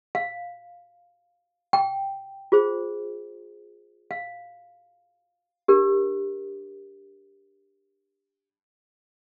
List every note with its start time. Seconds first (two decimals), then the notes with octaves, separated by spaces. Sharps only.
0.15 F5
1.73 G5
2.52 F4 G#4 C5
4.11 F5
5.68 D4 G4 A#4